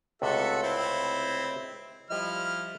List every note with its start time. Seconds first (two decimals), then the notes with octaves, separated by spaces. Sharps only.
0.22 C#2 A2 C3 F#4 A4 E5
0.63 C4 E4
2.10 F3 G3 E4 D#5 F6